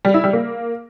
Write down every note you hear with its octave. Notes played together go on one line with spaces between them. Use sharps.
G3
E4
G3
A#3